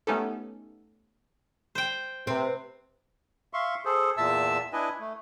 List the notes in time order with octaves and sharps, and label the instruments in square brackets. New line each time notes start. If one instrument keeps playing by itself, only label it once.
[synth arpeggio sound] A3 B3 C#4 D#4 G4 A4
[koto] C5 G5
[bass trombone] C3 [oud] C4 [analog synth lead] B4
[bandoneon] E5 F5 C6 C#6
G#4 A4 C5
E2 A#2 E5 A5 E6
D4 E4 B4 D#5 G#5
A3